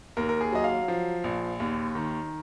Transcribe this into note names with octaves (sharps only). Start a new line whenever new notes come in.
D#2 A#4
A#4
G#4
F#3 D#5
F5
F3
A#1
D#2
D#3